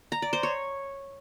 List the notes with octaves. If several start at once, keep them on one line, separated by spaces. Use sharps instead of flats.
A#5
D5
C5
C#5